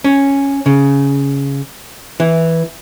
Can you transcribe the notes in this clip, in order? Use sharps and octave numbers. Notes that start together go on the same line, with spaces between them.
C#4
C#3
E3